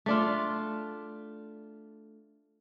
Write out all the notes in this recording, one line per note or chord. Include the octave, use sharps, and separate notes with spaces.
A3 D4 F4